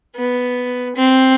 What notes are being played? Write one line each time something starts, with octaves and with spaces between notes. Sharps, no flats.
B3
C4